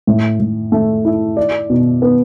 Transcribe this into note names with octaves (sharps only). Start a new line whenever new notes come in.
A2
A2
A3
E4
D5
B2
B3